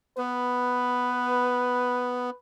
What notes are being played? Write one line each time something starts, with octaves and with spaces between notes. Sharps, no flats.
B3 B4